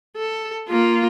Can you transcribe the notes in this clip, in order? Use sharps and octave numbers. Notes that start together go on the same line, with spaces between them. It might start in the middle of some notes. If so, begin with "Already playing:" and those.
A4
A#3 F4